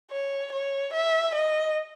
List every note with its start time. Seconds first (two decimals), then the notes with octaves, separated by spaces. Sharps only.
0.11 C#5
0.52 C#5
0.93 E5
1.34 D#5